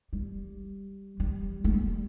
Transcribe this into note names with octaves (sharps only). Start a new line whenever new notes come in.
G3
G3
A3
G3